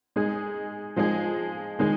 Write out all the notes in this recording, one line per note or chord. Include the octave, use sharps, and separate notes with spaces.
G#3 D#4 G#4
F3 G#3 D#4 G#4
D#3 G#3 D#4 G#4